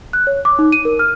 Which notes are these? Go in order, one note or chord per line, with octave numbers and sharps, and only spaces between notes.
F#6
C#5
D6
D#4
D#7
A#4
F6